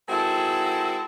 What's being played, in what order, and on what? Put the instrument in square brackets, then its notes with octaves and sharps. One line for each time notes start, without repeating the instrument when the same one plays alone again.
[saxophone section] D#3 G#3 C4 E4 F#4 A4